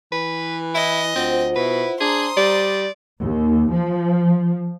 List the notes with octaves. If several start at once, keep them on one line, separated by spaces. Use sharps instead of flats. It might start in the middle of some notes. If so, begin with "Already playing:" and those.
E3 B4
E4 D#5
D2 C4 F4 C5 F#5
B2 E4 B4
D4 G#4 C5 A#5 C6 D#6
G3 D5
D#2
F3